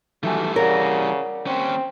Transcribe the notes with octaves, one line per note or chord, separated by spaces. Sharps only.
D#3 E3 F#3 G3 A3 G#5
C#3 A#4 C#5 D5 F#5
D#2 C4 C#4